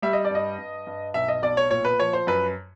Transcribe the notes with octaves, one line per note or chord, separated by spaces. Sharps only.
G3 E5
D#5
D5
G2 D#5
G2
G2
B1 E5
D#5
B1 D5
C#5
A#2 C#5
B4
F3 C#5
C5
F#2 B4